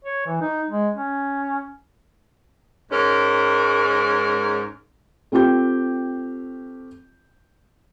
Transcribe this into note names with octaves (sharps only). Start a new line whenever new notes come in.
C#5
E3
D#4
G#3
C#4
G#2 G#3 C#4 A#4
A3 C4 F4 G4 G6